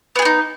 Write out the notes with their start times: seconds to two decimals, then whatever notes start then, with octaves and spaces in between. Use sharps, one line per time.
0.15 B3
0.19 G#4
0.22 G4
0.25 D#4